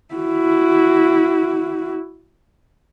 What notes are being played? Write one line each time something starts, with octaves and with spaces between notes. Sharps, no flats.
E4 F#4